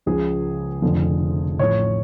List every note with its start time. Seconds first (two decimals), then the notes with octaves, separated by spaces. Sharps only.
0.06 C#2 C#3 F3 G#4
0.82 F1 F2 D3 F3
1.59 A1 A2 F3 C#5